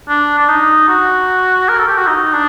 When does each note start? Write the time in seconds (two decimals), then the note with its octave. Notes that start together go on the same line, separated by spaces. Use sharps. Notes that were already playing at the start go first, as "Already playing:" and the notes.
0.09 D4
0.39 D4
0.48 D#4
0.89 F#4
1.69 A#4
1.79 A4
1.88 G4
1.98 F#4
2.07 D#4
2.33 D4